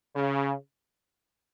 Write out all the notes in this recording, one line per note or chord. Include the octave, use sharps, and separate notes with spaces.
C#3